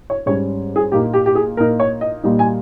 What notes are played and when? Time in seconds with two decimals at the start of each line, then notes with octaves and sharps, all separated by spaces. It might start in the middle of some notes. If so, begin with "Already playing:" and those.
0.10 C#5
0.26 G#2 G3 C#4 C#5
0.76 G#4
0.92 A#2 A#3 D#4 G4
1.14 G4
1.26 G4
1.35 G#4
1.57 A#2 A#3 D#4 A#4
1.80 C#5
2.01 D#5
2.23 A#2 G3 A#3 D#4
2.39 G#5